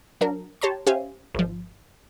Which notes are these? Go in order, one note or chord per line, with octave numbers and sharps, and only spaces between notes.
F#3 D4 A#4
G4 C#5 A5 A#5 C6
C#4 G4 C5 E5 F5 G#5
G#1 F3